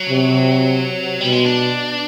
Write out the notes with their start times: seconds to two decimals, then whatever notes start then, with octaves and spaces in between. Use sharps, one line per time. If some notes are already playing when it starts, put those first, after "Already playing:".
Already playing: F#3
0.09 C3
1.21 B2 G3
1.32 G#3
1.45 D4